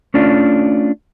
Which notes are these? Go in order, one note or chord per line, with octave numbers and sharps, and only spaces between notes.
A3 C#4 D4 F4